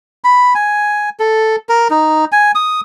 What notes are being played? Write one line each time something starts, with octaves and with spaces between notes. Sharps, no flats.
B5
G#5
A4
A#4
D#4
G#5
D#6